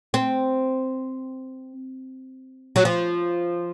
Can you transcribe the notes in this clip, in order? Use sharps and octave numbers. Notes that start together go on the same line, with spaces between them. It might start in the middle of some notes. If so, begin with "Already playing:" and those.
C4
F#3
F3